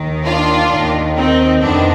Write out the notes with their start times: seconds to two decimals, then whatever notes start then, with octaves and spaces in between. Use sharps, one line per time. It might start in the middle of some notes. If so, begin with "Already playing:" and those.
Already playing: D#2 D#3
0.25 D4 F4
0.71 D#2 D#3
1.17 C4 D#4
1.62 F2 C3 D#3 B3 D4